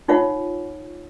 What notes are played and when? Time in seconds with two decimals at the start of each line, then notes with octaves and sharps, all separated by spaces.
0.08 D#4 F4 C#5 F#5